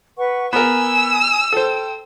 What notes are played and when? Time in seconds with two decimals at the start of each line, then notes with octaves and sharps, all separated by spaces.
0.17 B4 F#5 C#6
0.53 B3 A#4 G#5 E6
1.53 A4 C5 G5